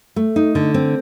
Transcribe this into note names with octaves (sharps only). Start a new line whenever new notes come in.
A3
D#4
D3
C4